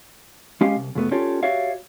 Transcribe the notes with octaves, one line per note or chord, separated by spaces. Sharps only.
G#3 C#4 G4 D#5 F5
C2
C#2 F#2 A3 B3
C#4 F4 G4 A4 C#5 D5
F#4 G4 C#5 D5 E5 F5